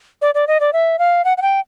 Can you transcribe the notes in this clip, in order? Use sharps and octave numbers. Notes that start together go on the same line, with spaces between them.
D5
D5
D#5
D5
E5
F5
F#5
F#5
G5